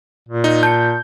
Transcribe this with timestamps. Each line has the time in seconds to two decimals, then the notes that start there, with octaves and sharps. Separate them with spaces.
0.29 A#2
0.44 D#4
0.63 A5 G6 C#7